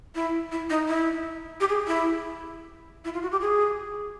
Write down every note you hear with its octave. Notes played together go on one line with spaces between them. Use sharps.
E4
E4
D#4
E4
G4
G#4
E4
E4
F4
F#4
G4
G#4